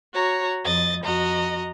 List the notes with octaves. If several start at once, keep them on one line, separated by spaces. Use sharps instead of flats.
F#4 C#5 A#5
F2 D#5 A6
F2 F#4 D#5 A#5